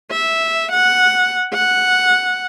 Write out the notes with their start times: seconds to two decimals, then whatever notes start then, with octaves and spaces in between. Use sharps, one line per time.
0.11 E5
0.72 F#5
1.54 F#5